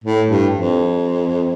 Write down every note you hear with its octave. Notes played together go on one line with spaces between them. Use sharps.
A2
G2
F2